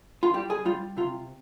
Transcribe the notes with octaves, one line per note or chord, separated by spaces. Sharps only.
F4
G3 G4
G#4
G3 F4
C3 F4